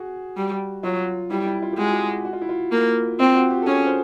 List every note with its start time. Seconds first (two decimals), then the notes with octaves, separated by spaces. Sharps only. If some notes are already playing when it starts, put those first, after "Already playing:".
Already playing: F#4 G#4
0.37 G3
0.83 F#3 F4
1.31 G3 E4
1.46 E4
1.62 F4
1.73 G4
1.78 G#3 F#4
1.93 G4
2.09 F#4
2.25 F#4
2.33 F4
2.42 E4
2.49 F4
2.72 A#3
3.20 C4 F4
3.35 F#4
3.50 G4
3.62 A4
3.66 C#4 G#4
3.86 C5